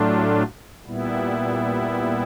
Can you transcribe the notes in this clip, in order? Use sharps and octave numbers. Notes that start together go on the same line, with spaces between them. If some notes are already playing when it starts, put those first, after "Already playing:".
Already playing: A2 F#3 A3 D4 F4
A#2 G3 B3 E4